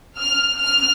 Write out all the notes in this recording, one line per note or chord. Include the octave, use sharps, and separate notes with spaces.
F6
F6